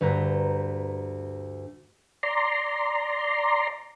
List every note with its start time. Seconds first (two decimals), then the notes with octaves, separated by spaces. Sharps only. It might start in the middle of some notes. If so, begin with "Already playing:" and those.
0.01 D2 G2 B4 A#5 G6
2.23 D5 A#5 C6